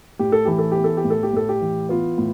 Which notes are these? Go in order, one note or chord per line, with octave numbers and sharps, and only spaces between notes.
A2 G4
A4
E3 G4
A4
B3 G4
A4
G4
A2
A4
G4
A2 A4
G4
E3
B3 F4
A2